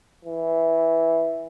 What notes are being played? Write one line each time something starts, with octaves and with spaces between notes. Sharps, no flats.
E3